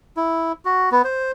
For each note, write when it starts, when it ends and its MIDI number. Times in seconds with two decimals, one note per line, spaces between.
0.17 0.52 64
0.65 0.89 66
0.91 1.02 59
1.04 1.32 72